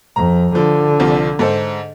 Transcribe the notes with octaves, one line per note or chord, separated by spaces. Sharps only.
F2 A#5
D3 F3
C2 C3 F3
G#2 A4 C5